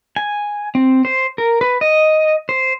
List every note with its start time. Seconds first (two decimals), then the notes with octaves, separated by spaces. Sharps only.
0.16 G#5
0.75 C4
1.05 C5
1.38 A#4
1.61 B4
1.81 D#5
2.49 C5